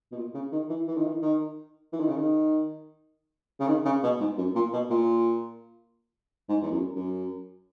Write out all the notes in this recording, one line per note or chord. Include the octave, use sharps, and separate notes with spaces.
B2
A#2
C#3
D#3
E3
E3
D#3
E3
D#3
E3
D#3
C#3
D#3
C#3
D#3
C#3
B2
G#2
F#2
A#2
B2
A#2
G#2
E2
F#2
F#2